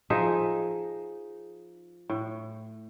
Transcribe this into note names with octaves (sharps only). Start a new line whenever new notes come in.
F3 D#4 G#4 E5
A2